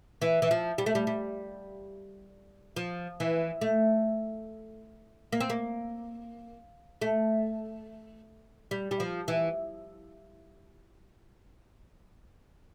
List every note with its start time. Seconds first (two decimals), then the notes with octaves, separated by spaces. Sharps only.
0.22 E3
0.42 E3
0.51 F3
0.78 G3
0.86 A3
0.95 G3
1.07 G3
2.76 F3
3.20 E3
3.61 A3
5.33 A#3
5.41 C4
5.50 A#3
7.02 A3
8.71 G3
8.91 G3
9.00 F3
9.28 E3